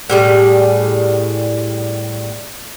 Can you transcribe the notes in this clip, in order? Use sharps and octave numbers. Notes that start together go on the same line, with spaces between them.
A2 G3 G#4